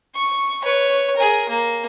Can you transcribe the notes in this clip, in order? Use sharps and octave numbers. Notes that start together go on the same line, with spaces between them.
C#6
B4 C#5
G#4 A#4
A#3